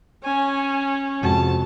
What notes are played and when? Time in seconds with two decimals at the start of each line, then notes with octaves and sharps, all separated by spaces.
0.24 C#4 G#5
1.23 F2 C3 G#3 F#4 A5